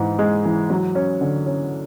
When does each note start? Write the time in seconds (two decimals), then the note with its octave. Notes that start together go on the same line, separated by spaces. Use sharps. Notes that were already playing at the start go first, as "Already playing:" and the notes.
Already playing: G#2 E3
0.19 G#3
0.45 E3
0.70 F#3
0.95 C#4
1.21 D3
1.46 C#4